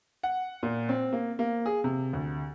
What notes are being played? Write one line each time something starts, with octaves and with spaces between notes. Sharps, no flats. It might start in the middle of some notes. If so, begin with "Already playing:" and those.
F#5
A#2
C4
A#3
A#3
G#4
C3
D2